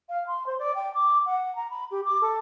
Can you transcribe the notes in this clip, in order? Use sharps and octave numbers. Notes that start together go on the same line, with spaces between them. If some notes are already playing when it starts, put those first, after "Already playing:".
F5
C6
C5
D5
G5
D6
F#5
A#5
B5
G4
D6
A4